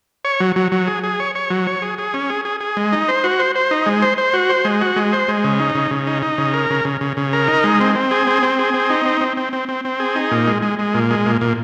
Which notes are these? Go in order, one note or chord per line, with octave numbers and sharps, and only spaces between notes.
C#5
F#3
F#3
F#3
G#4
G#4
C#5
C#5
F#3
C#5
G#4
G#4
C#4
G#4
G#4
G#4
G#3
D#4
C5
F#4
C5
C5
D#4
G#3
C5
C5
F#4
C5
G#3
F#4
G#3
C5
G#3
C#3
D#4
C#3
C#3
D#4
D#4
C#3
A#4
C#3
C#3
C#3
C#3
A#4
D#4
G#3
C4
C4
G#4
C4
C4
G#4
C4
D#4
C4
C4
C4
C4
C4
C4
G#4
D#4
A#2
G#3
G#3
G#3
A#2
G#3
A#2
A#2